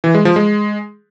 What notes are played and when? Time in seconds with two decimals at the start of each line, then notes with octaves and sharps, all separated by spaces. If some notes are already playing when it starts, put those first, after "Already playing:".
0.04 E3
0.15 G#3
0.25 F3
0.36 G#3